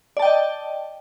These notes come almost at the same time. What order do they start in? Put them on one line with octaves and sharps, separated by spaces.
D5 A5 G5 D#5